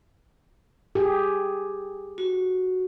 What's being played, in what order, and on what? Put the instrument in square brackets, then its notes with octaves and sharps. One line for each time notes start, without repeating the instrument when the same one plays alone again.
[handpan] G4 G#4
[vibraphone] F#4